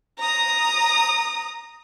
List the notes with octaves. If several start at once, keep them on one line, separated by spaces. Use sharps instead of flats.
A#5 D#6